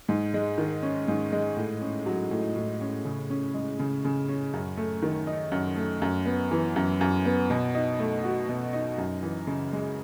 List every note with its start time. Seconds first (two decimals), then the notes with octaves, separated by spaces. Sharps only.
0.09 G#2
0.34 G#3
0.58 D#3
0.83 C#4
1.08 G#2
1.32 G#3
1.57 A2
1.81 C#4
2.06 F#3
2.31 A2
2.56 A2
2.81 C#4
3.05 C#3
3.30 C#4
3.54 G#3
3.79 C#3
4.04 C#3
4.28 C#4
4.53 F#2
4.77 A3
5.02 D#3
5.27 D#4
5.52 F#2
5.76 A3
6.02 F#2
6.26 B3
6.51 E3
6.76 F#2
7.01 F#2
7.25 B3
7.50 B2
7.75 D#4
7.99 A3
8.24 F#4
8.49 B2
8.73 D#4
8.98 F#2
9.23 E3
9.47 C#3
9.73 G#3